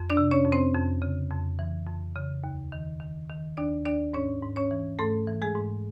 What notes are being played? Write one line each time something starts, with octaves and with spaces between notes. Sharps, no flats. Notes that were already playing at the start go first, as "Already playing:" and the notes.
Already playing: F2
D4 D5
C3
C#4 C#5
F2
C4 C5
F2
C#3
F2
E3
F2
C#3
D#2
D#3
D#3
D#3
D#2 D4 D5
D#2 D4 D5
G#2 C#4 C#5
G#2
C#4 C#5
E3
G#2 A3 A4
E3
G#3 G#4
G#2